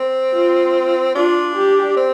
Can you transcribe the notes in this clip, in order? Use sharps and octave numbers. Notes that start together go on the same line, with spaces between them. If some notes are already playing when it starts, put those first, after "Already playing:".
Already playing: C4
F4
D4 F4
G4
C4